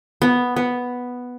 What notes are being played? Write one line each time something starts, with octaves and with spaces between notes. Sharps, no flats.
B3
B3